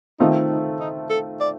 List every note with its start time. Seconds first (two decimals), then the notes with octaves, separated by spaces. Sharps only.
0.20 D#3 A3 C4 D#4 F4
0.50 D#4
0.80 D#4
1.10 A4
1.40 D5